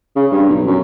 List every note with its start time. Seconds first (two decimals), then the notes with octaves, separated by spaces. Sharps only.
0.16 C#3
0.32 G2
0.49 B1
0.67 F#2